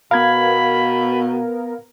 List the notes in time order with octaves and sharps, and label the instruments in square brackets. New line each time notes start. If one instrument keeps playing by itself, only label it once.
[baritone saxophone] B2 [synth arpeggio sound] B3 A#4 [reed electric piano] F5 G#6 [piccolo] B5